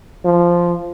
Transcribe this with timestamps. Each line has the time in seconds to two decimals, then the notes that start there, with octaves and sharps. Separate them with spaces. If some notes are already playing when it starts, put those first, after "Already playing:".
0.25 F3